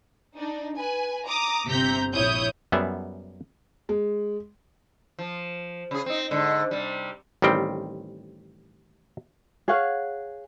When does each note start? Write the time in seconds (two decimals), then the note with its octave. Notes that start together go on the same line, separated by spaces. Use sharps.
0.36 D4 D#4
0.78 B4 G#5
1.26 A#5 D6 D#6
1.69 G1 C3 C4 A#5 G6 B6
2.13 A#1 E4 C#5 D#6 G6
2.72 F#2 G3 B3 G#4 E5
3.89 G#3
5.19 F3
5.91 C#3 G#4
6.06 C4 D#4
6.31 G#2 D3
6.71 C3 G3
7.42 A1 D#3 G3 C4 G5
9.68 G#4 C#5 F5 F#5